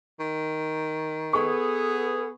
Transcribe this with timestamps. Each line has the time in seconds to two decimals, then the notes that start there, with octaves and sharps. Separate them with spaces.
0.20 D#3
1.33 B3 G#4 A4 C#6